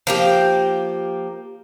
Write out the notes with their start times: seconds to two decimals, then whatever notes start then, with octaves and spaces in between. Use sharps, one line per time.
0.07 F3 A#3 G4